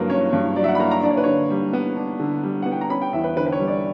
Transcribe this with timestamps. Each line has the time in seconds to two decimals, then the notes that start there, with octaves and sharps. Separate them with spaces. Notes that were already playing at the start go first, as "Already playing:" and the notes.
Already playing: G2 F#3 A#3 A#4 B4
0.10 C#4 C#5
0.33 G2
0.56 F#3 D5
0.64 E5
0.68 F#5
0.75 B5
0.79 A#3 A#5
0.91 A#5
1.03 D4 D5
1.10 C#5
1.17 B4
1.24 D3 C#5
1.50 G3
1.73 B3
1.96 D4
2.20 D3
2.43 G3
2.62 B3 F#5
2.71 G5
2.81 A#5
2.90 C#4 B5
3.02 G5
3.13 E2 E5
3.24 B4
3.36 D3 B4
3.46 B4
3.52 C#5
3.59 G3
3.67 D5